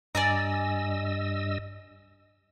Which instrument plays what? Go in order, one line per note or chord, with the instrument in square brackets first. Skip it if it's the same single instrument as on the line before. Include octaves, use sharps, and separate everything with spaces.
[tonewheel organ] G2 D#5 E6 [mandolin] D5 G#5 A#5